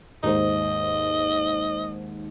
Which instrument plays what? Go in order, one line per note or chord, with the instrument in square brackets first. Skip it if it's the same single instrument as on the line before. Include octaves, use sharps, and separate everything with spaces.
[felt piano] D#2 G#2 C5 [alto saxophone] D#5